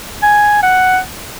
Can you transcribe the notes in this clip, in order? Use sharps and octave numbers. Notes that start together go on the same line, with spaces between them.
G#5
F#5